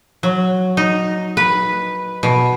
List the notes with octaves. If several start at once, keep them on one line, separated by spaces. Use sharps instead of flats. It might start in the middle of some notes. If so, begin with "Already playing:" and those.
F#3
D#4
B4
B2